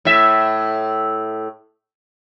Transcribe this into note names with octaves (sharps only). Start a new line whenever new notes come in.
A2 E5